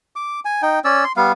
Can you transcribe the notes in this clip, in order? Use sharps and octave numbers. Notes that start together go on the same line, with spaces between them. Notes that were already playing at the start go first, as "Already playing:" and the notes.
D6
G#5
D#4 G5
C#4 D5 E6
C6
G3 B3 F5